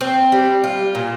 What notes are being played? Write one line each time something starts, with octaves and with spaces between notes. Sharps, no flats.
C4
G3
F4
A#2